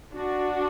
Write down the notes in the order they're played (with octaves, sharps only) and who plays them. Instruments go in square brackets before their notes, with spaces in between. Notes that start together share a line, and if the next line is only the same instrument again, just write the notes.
[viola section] D4 F#4